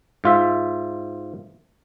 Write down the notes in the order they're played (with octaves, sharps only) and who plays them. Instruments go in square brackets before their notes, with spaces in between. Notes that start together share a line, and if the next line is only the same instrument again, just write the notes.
[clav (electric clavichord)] G#2 F4 E5